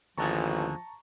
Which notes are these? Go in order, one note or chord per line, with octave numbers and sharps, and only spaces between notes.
A1 D#2 D3 F3 G#4 A5 A#5 C#6